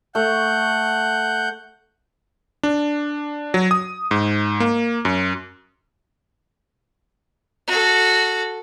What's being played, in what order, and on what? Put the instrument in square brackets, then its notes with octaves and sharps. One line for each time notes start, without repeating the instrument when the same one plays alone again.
[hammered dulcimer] A3 [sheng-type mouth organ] F#5 G6
[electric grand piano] D4
F#3
D#6
G#2
A#3
F#2
[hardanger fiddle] F#4 A4